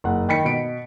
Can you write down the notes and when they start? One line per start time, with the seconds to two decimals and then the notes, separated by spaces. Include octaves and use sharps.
0.04 F#1 F#5
0.28 D#3 G5 B5 B6 C#7
0.45 B2 D7